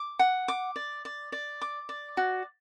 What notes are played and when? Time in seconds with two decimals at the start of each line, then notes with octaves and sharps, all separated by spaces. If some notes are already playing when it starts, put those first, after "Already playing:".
Already playing: D6
0.19 F#5
0.48 D6
0.76 D5
1.05 D5
1.32 D5
1.61 D6
1.89 D5
2.17 F#4